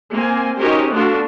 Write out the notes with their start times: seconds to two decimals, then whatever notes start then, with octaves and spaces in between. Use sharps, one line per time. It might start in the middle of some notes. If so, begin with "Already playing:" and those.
0.13 A#3 C4 G#5
0.59 C#4 D#4 F#4 G4 A#4 C5
0.91 A3 B3 D4 F4 F#4 A4